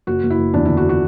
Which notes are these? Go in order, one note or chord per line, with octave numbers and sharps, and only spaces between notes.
F#1 F#4
F#1
E4
F#1
E2 D4
D3 E4
F#4
F#4